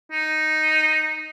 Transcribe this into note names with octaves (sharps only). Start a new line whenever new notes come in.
D#4